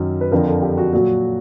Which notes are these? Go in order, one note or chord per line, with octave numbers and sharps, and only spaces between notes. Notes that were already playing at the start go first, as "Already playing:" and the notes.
Already playing: F#2 D#3 F#3
B4
F2 D3 F3 A#4
A4
G4
F#4
A#2 F#3 F#4